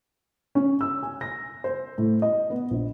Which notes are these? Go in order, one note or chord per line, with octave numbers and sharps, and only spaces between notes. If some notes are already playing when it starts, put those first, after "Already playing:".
C#4
E6
G#5
A#6
C5
A2
D#5
B3
A#1